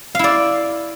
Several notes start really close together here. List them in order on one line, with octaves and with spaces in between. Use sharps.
F5 E4 D5